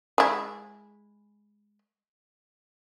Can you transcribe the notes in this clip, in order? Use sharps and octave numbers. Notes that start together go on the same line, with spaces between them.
G#3 E4